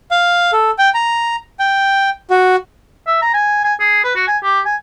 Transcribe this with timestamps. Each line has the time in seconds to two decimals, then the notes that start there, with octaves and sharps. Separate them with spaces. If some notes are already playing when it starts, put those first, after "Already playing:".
0.11 F5
0.53 A4
0.78 G5
0.94 A#5
1.59 G5
2.30 F#4
3.07 E5
3.22 A#5
3.34 G#5
3.64 G#5
3.80 G#4
4.04 B4
4.16 F#4
4.28 G#5
4.43 G4
4.65 G#5